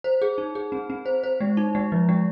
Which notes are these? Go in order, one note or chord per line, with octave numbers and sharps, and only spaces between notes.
C5
G#4
D#4
G#4
C4
C4
C5
C5
G#3
D#4
G#3
F3
G#3